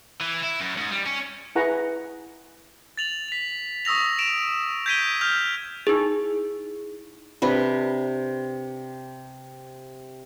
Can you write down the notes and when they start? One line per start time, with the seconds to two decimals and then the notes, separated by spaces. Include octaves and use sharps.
0.21 E3
0.44 E4
0.60 F#2
0.78 G#2
0.91 G3
1.06 C#4
1.55 E4 G#4 B4 F#5 A#5 C#6
2.97 A6 F7 F#7
3.28 B6 F7
3.85 C#6 D#6 E6 A#6 F7
4.19 D7 E7 F7
4.86 G6 G#6 B6 D7 D#7 G7
5.21 F6 G6 F7
5.87 D#4 E4 G#4
7.42 C3 D4 B4